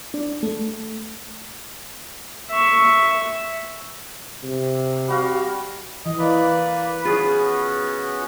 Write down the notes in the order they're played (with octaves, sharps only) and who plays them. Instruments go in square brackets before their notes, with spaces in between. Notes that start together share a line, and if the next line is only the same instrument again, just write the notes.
[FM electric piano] D4
A3
[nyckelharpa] E5 C#6
[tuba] C3
[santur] G3 F#4 F5
[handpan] E3 [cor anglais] D#5
[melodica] A#3 D5 [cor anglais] B4
[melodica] B3 C#4 F#4 [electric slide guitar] F4 G#4